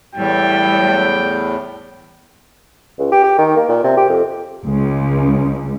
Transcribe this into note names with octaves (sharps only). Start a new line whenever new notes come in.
E2 A2 G3 G5
C#2
G4
G4
D#3
A#3
A#2
C3
G4
F2
C#2